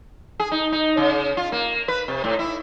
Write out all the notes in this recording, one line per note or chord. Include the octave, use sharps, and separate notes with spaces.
G#4
D#4
D#4
C#3
F4
A#3
B4
C3
A2
E4